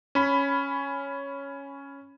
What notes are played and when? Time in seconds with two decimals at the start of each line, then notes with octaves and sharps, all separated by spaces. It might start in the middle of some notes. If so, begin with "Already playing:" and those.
0.15 C#4 B5